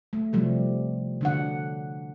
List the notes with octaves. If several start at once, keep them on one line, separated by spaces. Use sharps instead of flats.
A3
C3 F3 G3 A3
D3 D4 F#5